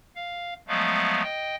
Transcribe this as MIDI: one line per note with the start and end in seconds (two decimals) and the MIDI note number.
0.16 0.54 77
0.68 1.22 53
0.68 1.22 54
0.68 1.22 56
0.68 1.22 57
0.68 1.22 59
0.68 1.22 77
1.22 1.55 75
1.22 1.55 79